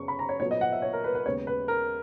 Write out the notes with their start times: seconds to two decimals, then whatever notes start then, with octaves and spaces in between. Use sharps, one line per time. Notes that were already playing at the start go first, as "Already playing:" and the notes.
Already playing: F#2 C#3 B3 C#6
0.08 B5
0.19 A#5
0.29 C#5
0.40 B1 A#2 F#3 B3 C#5
0.51 D#5
0.61 F#5
0.72 E5
0.82 C#5
0.93 A#4
1.04 B4
1.15 B4
1.26 D#2 C#3 G#3 B3 C#5
1.47 B4
1.68 A#4